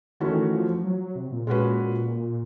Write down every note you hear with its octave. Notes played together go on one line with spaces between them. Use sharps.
D#3 E3 A3 C#4 F#4
F3
F#3
F#3
C3
A#2
A#2 G#3 C#4 F#4 B4